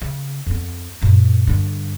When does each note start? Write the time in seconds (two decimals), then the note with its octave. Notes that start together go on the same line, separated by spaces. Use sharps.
0.02 C#3
0.46 F2 B3
1.02 F#2 A#2
1.47 G2 D3